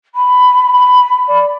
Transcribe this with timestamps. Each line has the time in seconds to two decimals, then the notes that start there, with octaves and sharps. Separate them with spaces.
0.14 B5
0.72 B5
1.27 D5